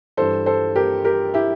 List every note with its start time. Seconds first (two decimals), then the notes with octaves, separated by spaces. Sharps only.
0.17 G2 E3 G3 A4 C5
0.46 A4 C5
0.76 G4 A#4
1.04 G4 A#4
1.34 E4 G4